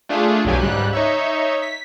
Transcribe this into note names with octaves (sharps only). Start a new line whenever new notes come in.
A3 D4 F4 G#4
B1 F2 D3 F#3 G4 G#5
C#2 G#2 G3 F#6
D#4 C#5 E5
B6